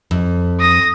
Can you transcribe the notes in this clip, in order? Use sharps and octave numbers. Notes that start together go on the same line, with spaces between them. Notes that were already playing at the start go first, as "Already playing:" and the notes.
F2
D#6 A#6